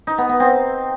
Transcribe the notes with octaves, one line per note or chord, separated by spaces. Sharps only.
D#4
B3
B3
C4